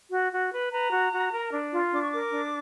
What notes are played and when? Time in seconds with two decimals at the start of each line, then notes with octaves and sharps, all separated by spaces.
0.11 F#4
0.32 F#4
0.52 B4
0.72 B4 A#5
0.92 F#4
1.12 F#4
1.32 A#4
1.52 D4
1.72 F4
1.92 D4 D6
2.00 C#6
2.09 A#4 D6
2.32 D4